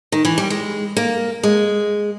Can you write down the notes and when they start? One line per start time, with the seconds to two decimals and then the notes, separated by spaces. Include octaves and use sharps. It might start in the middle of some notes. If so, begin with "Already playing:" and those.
0.12 D#3
0.25 E3
0.38 G3
0.50 G#3
0.97 A#3
1.43 G#3